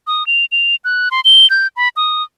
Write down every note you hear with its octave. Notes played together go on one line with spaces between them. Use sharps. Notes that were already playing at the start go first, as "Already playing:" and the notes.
D#6
F7
F7
F#6
C6
G7
G6
B5
D#6